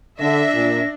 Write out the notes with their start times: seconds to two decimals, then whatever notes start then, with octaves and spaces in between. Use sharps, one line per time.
0.20 D3 D4 E5 A#6
0.53 A#2